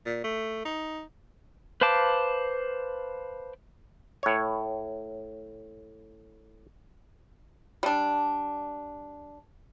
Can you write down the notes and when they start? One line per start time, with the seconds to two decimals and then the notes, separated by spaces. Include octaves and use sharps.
0.06 A#2
0.24 A3
0.65 D#4
1.81 B4 C5 F5 A5 D6
4.23 A2 C#5
7.83 G3 D4